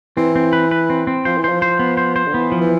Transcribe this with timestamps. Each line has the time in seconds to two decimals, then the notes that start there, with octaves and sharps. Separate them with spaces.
0.17 E3 C4
0.36 C4
0.53 B4
0.71 B4
0.90 C4
1.07 C4
1.25 F3 C5
1.38 E3
1.44 C5
1.49 F3
1.62 C5
1.79 B3
1.97 C5
2.16 C5
2.27 D3
2.34 E3 B3
2.52 F3
2.61 E3